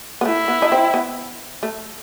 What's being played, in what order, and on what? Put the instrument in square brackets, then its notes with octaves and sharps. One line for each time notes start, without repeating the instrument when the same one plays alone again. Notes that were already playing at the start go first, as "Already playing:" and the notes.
[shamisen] B3
[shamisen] A3 [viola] E4
[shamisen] B3
D#4
C4
B3
A3